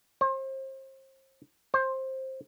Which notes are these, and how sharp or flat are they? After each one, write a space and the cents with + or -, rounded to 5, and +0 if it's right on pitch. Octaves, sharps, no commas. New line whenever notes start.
C5 +35
C5 +15